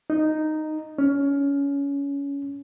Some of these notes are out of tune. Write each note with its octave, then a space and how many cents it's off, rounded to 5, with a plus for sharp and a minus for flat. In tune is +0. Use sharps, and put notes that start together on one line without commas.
D#4 -5
C#4 +20